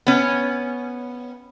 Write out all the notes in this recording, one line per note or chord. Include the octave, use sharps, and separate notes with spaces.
B3 C#4